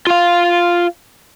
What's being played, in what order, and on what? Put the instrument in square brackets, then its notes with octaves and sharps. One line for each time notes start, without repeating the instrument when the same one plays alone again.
[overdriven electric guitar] F4 F5